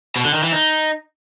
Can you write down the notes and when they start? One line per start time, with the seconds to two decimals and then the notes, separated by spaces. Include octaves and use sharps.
0.16 B2
0.25 D3
0.34 D#3
0.43 E3
0.52 D#4